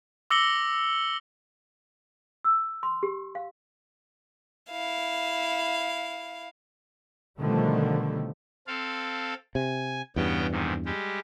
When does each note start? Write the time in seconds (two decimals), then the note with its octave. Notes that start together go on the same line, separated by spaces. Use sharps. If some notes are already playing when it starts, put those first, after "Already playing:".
0.30 D6 E6 A#6 C#7 F#7 G7
2.45 E6
2.83 C6
3.03 G4
3.35 F5
4.70 E4 F5
7.39 B2 D3 D#3 F3 G3 A3
8.67 C4 A4 F5
9.55 C3 G#5
10.16 E2 G2 C#3 B3 G5
10.51 G#2 C3 D#3
10.85 G3 G#3 G4